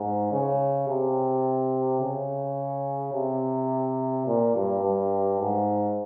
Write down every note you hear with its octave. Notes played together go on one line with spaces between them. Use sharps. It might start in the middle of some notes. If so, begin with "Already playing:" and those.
Already playing: G#2
C#3
C3
C#3
C3
A#2
G2
G2
G#2